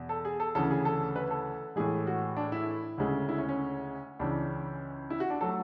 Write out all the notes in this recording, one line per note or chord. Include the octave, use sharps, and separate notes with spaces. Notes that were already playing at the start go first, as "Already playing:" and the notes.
Already playing: E2 B2
A4
G#4
A4
D2 C#3 E3 A4
G#4
A4
B4
A4
A2 E3 G#3 G#4
F#4
D4
E4
D2 C#3 G#3
E4
C#4
C#4
C#2 C#3 E3 D4
E4
F#4
D4
F#3 A3 A4